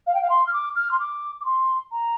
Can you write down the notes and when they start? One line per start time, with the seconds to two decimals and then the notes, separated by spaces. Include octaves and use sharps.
0.06 F5
0.14 G5
0.21 F5
0.29 C6
0.46 F6
0.53 D6
0.75 F6
0.91 C6
0.99 D6
1.40 D6
1.45 C6
1.91 A#5